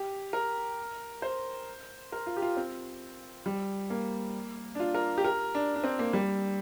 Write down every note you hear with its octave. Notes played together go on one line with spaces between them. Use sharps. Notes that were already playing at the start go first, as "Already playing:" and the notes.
Already playing: G4
A#4
C5
A#4
F4
G4
F4
C4
G3
A#3
D4
F4
A#4
G4
A#4
D4
D4
C4
A#3
G3